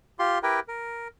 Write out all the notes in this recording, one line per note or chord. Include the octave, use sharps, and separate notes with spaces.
F4 G4 C6
E4 G4 A#4 B4 G5
A#4